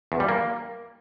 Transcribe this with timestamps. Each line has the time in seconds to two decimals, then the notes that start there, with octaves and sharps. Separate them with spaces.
0.12 E2
0.20 G3
0.29 A#3